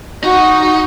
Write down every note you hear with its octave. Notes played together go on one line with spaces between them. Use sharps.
D#4 F#4